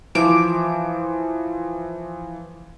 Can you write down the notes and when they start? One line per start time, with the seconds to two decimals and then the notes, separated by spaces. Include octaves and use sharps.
0.15 E3 F3 C5 D6